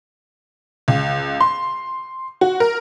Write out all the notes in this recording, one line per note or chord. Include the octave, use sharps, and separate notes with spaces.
C#2
C6
F#4
A#4